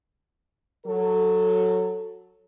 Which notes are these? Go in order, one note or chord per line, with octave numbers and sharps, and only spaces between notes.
F#3 A4